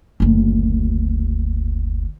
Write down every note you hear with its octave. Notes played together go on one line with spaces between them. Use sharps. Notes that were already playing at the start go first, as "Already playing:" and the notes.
F#1 D2